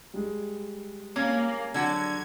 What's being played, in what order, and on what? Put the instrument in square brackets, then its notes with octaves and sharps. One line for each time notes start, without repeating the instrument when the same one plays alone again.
[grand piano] G3 G#3
[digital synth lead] A#3 [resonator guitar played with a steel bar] C#4
[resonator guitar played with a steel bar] D3 F#3 F#4 [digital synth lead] G#6